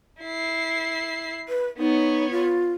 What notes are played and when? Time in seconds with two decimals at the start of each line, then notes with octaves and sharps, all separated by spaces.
0.22 E4 C7
1.49 B4
1.78 B3 D#4 C#5
2.31 F4